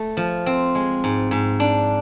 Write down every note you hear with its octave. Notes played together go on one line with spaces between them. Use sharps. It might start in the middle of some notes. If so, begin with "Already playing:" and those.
Already playing: A3
F3
C4
G#3
G#2
G#2
D4